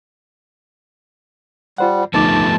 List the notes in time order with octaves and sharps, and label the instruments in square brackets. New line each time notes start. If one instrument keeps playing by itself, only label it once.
[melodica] G3 [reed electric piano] F4 C5 F#5
[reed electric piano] D2 D#4 D6 [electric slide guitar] F3 A3 B3 [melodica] A5